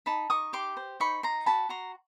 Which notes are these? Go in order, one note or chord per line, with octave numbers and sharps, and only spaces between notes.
D#4 A5 B5
D#4 C#6 D#6
G4 C6 D6
C5
D#4 B5 C#6
D#4 A#5 C6
F#4 A5 B5
F#4 A#5 C6